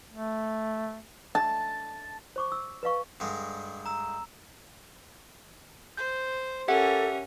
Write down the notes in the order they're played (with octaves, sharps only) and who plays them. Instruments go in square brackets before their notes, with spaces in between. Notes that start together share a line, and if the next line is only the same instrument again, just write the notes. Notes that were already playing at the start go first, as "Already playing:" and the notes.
[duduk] A3
[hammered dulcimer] A5
[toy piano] C5 C#6 D6
E6
B4 D#5 F5 C#6
[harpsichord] G2 D3 G#3
[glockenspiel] A#5 E6
[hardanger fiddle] C5 [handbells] G6
[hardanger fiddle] C#4 A#4 [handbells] G4 E5 F#5 [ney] A4